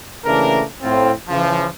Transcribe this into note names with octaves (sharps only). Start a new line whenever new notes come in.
C#3 E3 A3 A#3 D4 A#4
A2 C4 F4
C#3 E3 F3